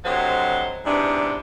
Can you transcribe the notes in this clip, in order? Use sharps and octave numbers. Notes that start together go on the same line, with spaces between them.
D2 C3 F#3 C5 D#5
E2 G#2 C3 D4